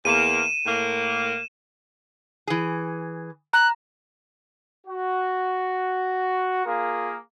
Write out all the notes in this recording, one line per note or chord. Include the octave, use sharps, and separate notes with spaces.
E2 A#3 D#7 E7
A2 A#3
E3 G#4
A#5 F#6
F#4
A#3 F4 G#4 A#4